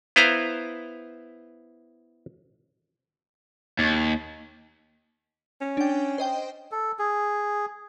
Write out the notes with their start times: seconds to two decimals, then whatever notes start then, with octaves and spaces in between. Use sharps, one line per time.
0.16 B3 E4 B4 C5 F5 A#5
3.79 D#2
5.61 C#4
5.77 D4 G5
6.18 C5 D#5 G5
6.72 A4
6.99 G#4